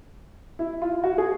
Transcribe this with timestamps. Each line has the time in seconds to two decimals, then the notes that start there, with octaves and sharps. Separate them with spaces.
0.59 E4
0.82 F4
1.04 F#4
1.18 G#4